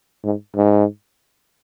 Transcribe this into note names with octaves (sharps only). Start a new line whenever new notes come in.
G#2
G#2